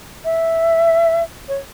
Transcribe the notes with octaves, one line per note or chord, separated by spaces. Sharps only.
E5
C#5